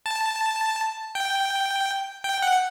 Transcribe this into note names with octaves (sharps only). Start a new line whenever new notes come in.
A5
G5
G5
F#5